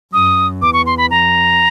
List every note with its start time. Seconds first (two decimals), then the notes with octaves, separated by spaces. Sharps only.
0.13 F#2 D#6
0.62 E2 D6
0.73 C#6
0.86 C6
0.98 B5
1.10 F2 A#5